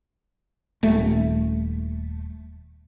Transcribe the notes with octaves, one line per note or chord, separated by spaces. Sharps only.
D#1 A3